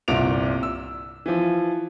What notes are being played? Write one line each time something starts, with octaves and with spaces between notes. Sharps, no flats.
G1 C2 A#2 D7 F7
E6
E3 F3